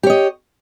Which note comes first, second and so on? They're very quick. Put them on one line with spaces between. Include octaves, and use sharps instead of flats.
G4 C#5 D#5